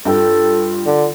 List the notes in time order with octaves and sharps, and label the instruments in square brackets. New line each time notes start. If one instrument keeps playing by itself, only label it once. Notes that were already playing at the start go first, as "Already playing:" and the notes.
[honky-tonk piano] G2 G5 [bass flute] F4 [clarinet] A4
[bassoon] D3